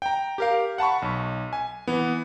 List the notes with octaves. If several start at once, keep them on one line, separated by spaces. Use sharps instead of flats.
G5 A#5
G4 A#4 F5
F#5 A5 B5 C#6
B1
G#5
E3 B3